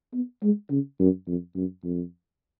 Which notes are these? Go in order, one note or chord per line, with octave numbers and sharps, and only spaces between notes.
B3
G#3
C#3
F#2
F2
F#2
F2